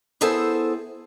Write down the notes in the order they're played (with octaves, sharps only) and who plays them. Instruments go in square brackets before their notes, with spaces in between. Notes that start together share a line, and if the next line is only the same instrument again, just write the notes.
[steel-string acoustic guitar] B3 E4 G#4 A4 C5